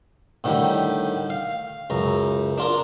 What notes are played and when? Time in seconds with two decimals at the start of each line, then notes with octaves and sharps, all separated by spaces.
0.44 A2 D3 D#3 G3
1.30 F5
1.90 C#2 F#2 A#5
2.58 D4 F4 A#4